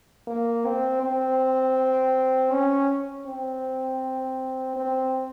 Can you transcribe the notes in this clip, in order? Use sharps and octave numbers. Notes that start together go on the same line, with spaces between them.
A#3
C4
C4
C#4
C4
C4